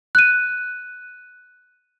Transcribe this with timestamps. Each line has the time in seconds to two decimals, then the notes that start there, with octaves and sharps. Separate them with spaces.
0.15 F#6 D#7